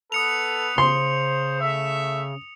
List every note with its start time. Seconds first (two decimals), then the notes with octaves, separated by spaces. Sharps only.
0.12 B3 A4 B4 D#6 C#7 F7
0.78 C#3 C5 C6
1.61 A3 E5